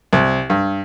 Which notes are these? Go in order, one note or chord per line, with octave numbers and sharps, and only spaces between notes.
C2
G2